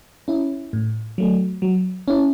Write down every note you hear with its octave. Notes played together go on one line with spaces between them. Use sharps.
C#4 E4
A2
F#3 A3
F#3
C#4 E4